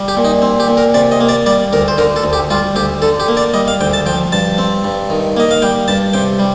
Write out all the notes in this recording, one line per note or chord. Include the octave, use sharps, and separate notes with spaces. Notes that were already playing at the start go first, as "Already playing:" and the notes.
Already playing: G3
G4
A#2
D#4
C4
G4
A#2
A#4
C3 D5
D#5
A#3
D5
G3 D5
D2 A#4
C5
D3 A#4
A4
D2
G4
G3 F4
D2 G4
D3 A4
G4
A#3
D5
G3 D#5
F5
D2 G5
A5
F3 G5
G2 A5
C4
G2
D#3
A#3 D#5
F5
G3 G5
G2 A5
C3 G5
G3